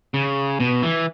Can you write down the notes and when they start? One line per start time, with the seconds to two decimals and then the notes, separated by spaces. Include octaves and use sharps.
0.14 C#3
0.60 B2
0.83 E3